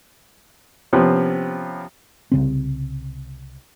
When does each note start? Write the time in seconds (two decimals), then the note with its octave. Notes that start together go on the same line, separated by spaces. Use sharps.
0.93 C3 F3 B3 C#4
2.32 C2 C#3 C4